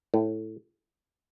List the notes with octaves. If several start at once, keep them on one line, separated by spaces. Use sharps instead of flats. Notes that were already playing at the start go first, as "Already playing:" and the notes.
A2